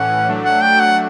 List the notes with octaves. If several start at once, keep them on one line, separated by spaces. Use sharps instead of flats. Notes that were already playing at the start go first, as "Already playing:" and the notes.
Already playing: A2 E3 C#4 F#5
F#3 A3 D4
F#5
G5
F#5